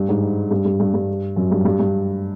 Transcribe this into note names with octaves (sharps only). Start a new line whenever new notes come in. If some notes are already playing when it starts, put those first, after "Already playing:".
Already playing: G2
G#2
G2
G2
G2
G2
F#2
G2
G2
G2